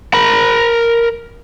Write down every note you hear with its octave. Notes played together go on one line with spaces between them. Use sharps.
A#4 B5